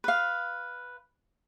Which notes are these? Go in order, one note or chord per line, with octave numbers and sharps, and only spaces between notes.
B4 F5